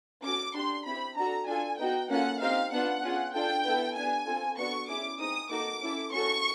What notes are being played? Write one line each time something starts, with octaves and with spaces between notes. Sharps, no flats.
C#4 F#4 A4 D6
D4 G4 C6
C4 E4 G4 B5
D4 F#4 A4 A#5
D4 F4 A4 G#5
B3 D#4 F#4 G5
A#3 C#4 F4 A4 F#5
C4 D#4 G4 F5
B3 D4 F4 F#5
C#4 F4 G#4
D4 F4 A4 G5
B3 E4 A4
B3 D4 G4 G#5
C4 F4 A4
B3 D4 F#4 A4 C#6
C#4 E4 G#4 D6
C4 D#4 G#4 D#6
A#3 D#4 F#4 A4 D6
C#4 E4 A4
C#4 F#4 A4 C#6